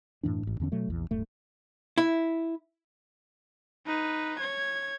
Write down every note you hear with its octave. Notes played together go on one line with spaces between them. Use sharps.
F#2 A2 E3 D4
A1 G#2
E2 D3 C#4
B2 F#3 A3
A#1 E2
D1 G2 A3
E4
D#4 B4
C#5 G#6